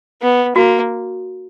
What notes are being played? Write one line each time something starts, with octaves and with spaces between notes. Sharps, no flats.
B3
A#3 F#4